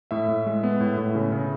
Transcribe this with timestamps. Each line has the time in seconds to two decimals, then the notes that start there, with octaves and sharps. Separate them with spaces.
0.11 A2 E5
0.28 A2
0.46 G#3
0.63 B3
0.81 A2
0.98 A2
1.15 C#3
1.32 C#3